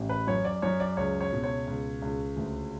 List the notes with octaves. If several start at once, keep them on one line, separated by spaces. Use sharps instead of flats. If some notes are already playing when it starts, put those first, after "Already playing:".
Already playing: A1
B4
F#2 C#5
D5
F#2 C#5
D5
C#2 C#5
C#5
B2
C#5
C#2
C#2
D2